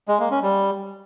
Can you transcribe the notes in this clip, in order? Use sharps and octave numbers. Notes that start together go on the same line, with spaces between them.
G#3
A#3
C#4
G3